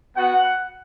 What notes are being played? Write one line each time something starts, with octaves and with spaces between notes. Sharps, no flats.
B3 F#4 F#5